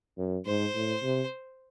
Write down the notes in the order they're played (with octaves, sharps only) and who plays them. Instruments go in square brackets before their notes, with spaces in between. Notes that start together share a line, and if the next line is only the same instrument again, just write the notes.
[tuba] F#2
[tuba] G#2 [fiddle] C5
[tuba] A2
C3